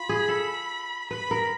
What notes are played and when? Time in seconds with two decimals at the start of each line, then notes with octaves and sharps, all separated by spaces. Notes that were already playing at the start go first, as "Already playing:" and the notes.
Already playing: F4 B5
0.09 G#4
0.28 A4
1.10 B4 B5
1.31 A#4